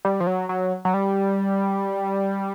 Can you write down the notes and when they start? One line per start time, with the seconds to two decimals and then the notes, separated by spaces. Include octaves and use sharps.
0.05 G3
0.20 F3
0.27 F#3
0.49 F#3
0.85 F#3
0.94 G3